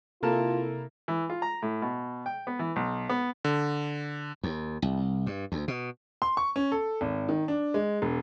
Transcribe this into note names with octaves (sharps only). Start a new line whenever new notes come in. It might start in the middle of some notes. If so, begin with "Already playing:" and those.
C3 A#3 E4 F4 A4 A#4 A5
E3
F4
A#5
A2
B2
G5
B3
E3
B1
B3
D3
D#2
C2
G2
D2
B2
C6
C#6
C#4
A4
G#1
D#3
D4
G#3
E1